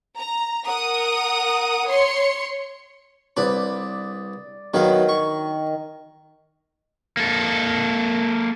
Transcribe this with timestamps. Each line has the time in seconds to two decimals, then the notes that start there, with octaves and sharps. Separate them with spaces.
0.18 A#5
0.66 A#4 F#5 D#6
1.87 C#5 C6 C#7
3.37 C2 B4 D5
4.74 D#3 F#3 B3 F5
5.09 C#6
7.17 A#3 A4